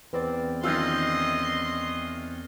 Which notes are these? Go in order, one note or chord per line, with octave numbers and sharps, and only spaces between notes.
E2 C4 B4 D5
D#3 E3 C#4 F4 D#5 C6 E6 G6